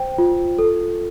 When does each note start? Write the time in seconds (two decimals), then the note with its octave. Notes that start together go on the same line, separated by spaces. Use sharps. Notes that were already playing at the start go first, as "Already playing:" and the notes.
Already playing: C5 G5
0.18 F4
0.59 A4